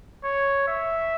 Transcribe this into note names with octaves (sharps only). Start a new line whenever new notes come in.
C#5
E5